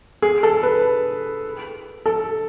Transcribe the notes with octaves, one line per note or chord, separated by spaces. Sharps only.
G#4
A4
B4
A4